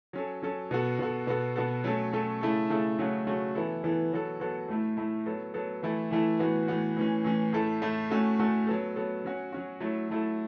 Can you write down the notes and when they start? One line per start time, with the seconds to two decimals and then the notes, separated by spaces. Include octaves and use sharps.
0.13 F#3 C#4 A4
0.42 F#3 C#4 A4
0.71 B2 B3 F#4 A4
0.99 B2 B3 F#4 A4
1.27 B2 B3 F#4 A4
1.56 B2 B3 F#4 A4
1.84 F#3 A3 C#4 A4
2.13 F#3 A3 C#4 A4
2.41 C#3 A3 E4 A4
2.70 C#3 A3 E4 A4
2.99 C#3 F#3 A3 F#4
3.27 C#3 F#3 A3 F#4
3.55 E3 B3 E4 A4
3.84 E3 B3 E4 A4
4.12 F#3 B3 F#4 A4
4.40 F#3 B3 F#4 A4
4.68 A2 A3 E4
4.97 A2 A3 E4
5.26 F#3 B3 A4
5.54 F#3 B3 A4
5.83 E3 A3 E4 A4
6.11 E3 A3 E4 A4
6.39 A2 E3 B3 F#4
6.68 A2 E3 B3 F#4
6.97 A2 E3 C#4
7.24 A2 E3 C#4
7.53 A2 A3 E4 A4
7.82 A2 A3 E4 A4
8.10 A2 A3 C#4 F#4 A4
8.39 A2 A3 C#4 F#4 A4
8.67 F#3 B3 A4
8.96 F#3 B3 A4
9.25 F#3 C#4 F#4
9.52 F#3 C#4 F#4
9.80 F#3 A3 E4 A4
10.09 F#3 A3 E4 A4